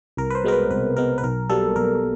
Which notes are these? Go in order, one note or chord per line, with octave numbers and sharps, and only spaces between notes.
C2 A#4
B4
C5
B2 G#3 B3 A#4
B4
C2 B4
B2 G#3 B3 A#4
B4
B1 A#4
B2 G3 A#3 A4
B1 A#4